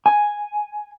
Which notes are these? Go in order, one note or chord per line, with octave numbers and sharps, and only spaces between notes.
G#5